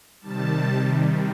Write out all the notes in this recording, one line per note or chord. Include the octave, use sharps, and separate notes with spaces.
C3 D#3 G3 A5